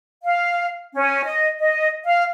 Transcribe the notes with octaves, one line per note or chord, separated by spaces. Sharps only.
F5
C#4
D#5
D#5
F5